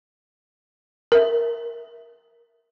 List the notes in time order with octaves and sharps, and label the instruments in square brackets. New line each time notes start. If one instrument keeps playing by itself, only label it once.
[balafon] A#4 E5